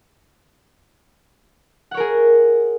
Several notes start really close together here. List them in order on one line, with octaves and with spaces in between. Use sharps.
F#5 C#5 A#4 G#4